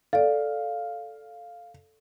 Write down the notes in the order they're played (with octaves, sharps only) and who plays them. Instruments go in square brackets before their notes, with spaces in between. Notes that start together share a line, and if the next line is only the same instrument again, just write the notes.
[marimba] A4 D5 [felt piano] F5